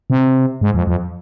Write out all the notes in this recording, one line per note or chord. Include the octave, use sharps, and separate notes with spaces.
C3
G#2
F2
F2